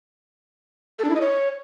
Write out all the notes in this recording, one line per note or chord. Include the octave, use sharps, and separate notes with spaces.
A4
D4
E4
D#5
C#5